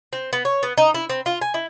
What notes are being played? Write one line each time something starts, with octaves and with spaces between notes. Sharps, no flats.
C4
B3
C#5
B3
D#4
E4
C4
F4
G#5
E4